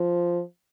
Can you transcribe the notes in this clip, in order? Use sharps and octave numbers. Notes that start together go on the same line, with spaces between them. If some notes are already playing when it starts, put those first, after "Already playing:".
Already playing: F3